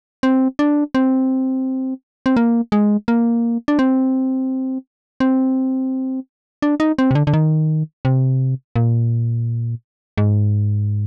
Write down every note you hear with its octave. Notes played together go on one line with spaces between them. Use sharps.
C4
D4
C4
C4
A#3
G#3
A#3
D4
C4
C4
D4
D#4
C4
C3
D3
D3
D#3
C3
A#2
G#2